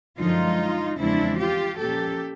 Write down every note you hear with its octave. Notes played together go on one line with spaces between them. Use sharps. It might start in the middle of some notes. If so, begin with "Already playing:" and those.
F#2 D3 F3 G#3 D#4 F4
E2 C#3 F3 G#3 C4 D4 E4
F4 G4
A#2 F3 A#3 C#4 G4 A4